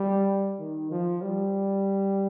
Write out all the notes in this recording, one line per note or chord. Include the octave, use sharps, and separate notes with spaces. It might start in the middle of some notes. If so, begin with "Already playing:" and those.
Already playing: G3
D#3
F3
G3